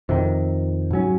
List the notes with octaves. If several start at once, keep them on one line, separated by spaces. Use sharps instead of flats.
F2 C3 D#3
G#2 F#3 C#4